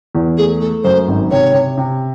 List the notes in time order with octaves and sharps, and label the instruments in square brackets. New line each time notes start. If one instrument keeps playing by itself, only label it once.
[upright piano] E2
[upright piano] A3 [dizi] G#4
[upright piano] A3 [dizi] A4
[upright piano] F#2 [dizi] C5
[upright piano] G#1
[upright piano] C3 [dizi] C#5
[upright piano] C3
C3